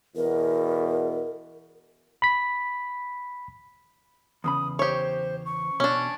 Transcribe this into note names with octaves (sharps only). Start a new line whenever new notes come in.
E2 B2 A#4
B5 B6
E2 C#3 B5 D#6
G4 C5 C#5
C#6
B2 C#4 D4